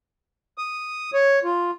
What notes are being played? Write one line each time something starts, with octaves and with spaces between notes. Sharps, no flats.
D#6
C#5
F4